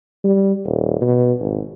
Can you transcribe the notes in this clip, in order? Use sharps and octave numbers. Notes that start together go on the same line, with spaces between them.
G3
D#1
B2
G#1